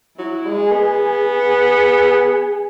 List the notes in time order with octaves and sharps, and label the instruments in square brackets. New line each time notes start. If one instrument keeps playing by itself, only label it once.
[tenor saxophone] F#3 [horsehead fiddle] E4
[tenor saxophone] G#3
[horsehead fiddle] G#4
[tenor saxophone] B3
[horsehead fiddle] G#4
G#4